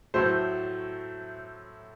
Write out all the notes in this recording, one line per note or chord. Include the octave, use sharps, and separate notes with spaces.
A2 F#3 A3 C5